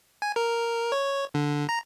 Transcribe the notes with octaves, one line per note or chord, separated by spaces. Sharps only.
G#5
A#4
C#5
D3
A#5